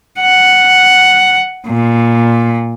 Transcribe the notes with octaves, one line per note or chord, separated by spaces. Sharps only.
F#5
A#2